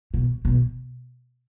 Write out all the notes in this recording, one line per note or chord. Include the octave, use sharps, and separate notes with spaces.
B2
B2